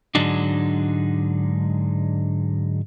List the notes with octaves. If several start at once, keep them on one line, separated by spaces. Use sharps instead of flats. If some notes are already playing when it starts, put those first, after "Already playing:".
G#2 D3 F#3 G#3 D4 D#4